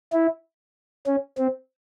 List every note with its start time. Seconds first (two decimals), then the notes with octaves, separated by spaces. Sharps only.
0.13 E4
1.07 C#4
1.38 C4